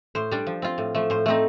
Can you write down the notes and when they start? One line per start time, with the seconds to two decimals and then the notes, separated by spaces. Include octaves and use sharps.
0.15 A2 C5
0.31 G3 D4
0.47 F3
0.62 C4 F4
0.78 A2
0.95 F3 A3
1.10 A2 C5
1.26 A3 C4 D#4